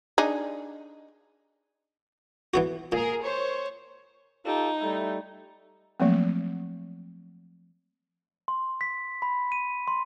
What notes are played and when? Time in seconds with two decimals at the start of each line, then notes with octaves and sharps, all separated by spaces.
0.18 D4 D#4 G#4
2.54 E3 B3 F#4
2.92 A#2 G#4 A#4
3.23 C5 C#5
4.45 D#4 F4 G4 A4
4.80 G3 A3 E4
6.00 F3 F#3 A3 A#3 C4
8.48 C6
8.81 B6
9.22 B5
9.52 D#7
9.88 C6